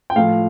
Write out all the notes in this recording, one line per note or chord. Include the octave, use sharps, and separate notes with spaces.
G5
A2 F3 F5